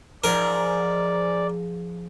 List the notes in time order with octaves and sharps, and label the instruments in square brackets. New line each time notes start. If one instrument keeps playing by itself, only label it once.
[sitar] G#2 [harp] F3 [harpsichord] A#4 [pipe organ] D5